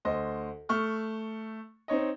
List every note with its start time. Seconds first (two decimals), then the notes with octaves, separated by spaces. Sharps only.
0.05 D2 C5 D#5
0.69 A3 C#6 F6
1.88 C4 D#4 C#5 D#5